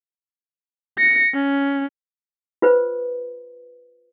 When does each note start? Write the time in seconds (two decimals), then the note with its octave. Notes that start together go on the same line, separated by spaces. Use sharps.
0.98 A#6 C#7
1.34 C#4
2.62 F4 B4 C5